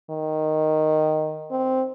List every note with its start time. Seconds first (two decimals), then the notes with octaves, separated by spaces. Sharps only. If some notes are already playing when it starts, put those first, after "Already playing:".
0.10 D#3
1.51 C4